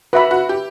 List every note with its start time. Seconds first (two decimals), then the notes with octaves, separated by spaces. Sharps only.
0.13 F#4 B4 E5 B5
0.31 F#4
0.49 G4